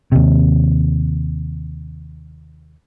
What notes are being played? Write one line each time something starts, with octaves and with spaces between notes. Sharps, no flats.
D#2 C3